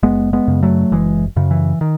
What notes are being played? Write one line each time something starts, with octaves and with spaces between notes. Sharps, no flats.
F#1 G#3 B3
G#3 B3
F#2 C#3
F#3 A3
F#1 E3 G#3
F#2 C#3
E3
D#3